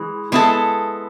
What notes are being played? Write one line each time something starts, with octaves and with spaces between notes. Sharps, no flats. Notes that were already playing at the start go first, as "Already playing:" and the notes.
Already playing: E3 G#3
G#3 B3 E4 A4